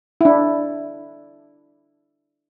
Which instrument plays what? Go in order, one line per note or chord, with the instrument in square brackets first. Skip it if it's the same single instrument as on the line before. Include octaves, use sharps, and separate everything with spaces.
[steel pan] D4 E4